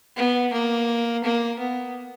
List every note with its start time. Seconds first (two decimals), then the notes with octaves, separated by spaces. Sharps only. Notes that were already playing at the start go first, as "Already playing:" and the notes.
0.16 B3
0.52 A#3
1.24 A#3
1.59 B3